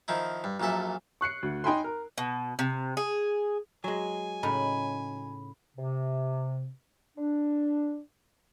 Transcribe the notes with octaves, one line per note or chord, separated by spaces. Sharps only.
D#3 F3 D#4 E4
G2
A#1 F#2 A#2 A4 E5
C#6 F#6 C7 C#7
D2
D#4 G5 G#5 B5 C6
A#4
B2
C3
G#4
F#3 G#3 G#5
A2 C#3 D#4 B5
C3
D4